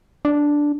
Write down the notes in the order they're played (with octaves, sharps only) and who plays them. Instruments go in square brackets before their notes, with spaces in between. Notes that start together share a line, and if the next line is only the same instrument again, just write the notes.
[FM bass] D4